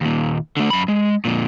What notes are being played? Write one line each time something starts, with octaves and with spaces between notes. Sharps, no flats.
D#2 A#2
D3 A3
F#2 B5
G#3
F2 A#2